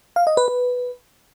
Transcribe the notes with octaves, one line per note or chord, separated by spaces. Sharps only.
F5
D#5
B4
B4